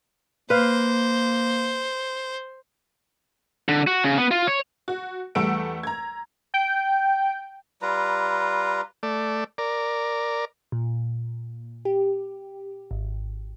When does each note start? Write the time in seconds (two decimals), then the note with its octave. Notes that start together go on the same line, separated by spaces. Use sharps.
0.50 A#3 B4 C5 F5
3.69 D3
3.87 F#4
4.04 C#3
4.18 B3
4.31 F4
4.47 C#5
4.88 F#4
5.35 E2 G3 A3 F#5 E6 D7
5.83 A#5 G#6
6.54 G5
7.82 G3 F4 B4 A#5
9.03 A3 D5
9.58 A#4 D5
10.72 A#2
11.85 G4
12.91 G#1